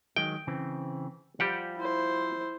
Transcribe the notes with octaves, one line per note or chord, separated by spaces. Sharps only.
D#3 F#3 G#3 G5
C#3 E3 C4
F3 G3 G4 F#5
E4 C5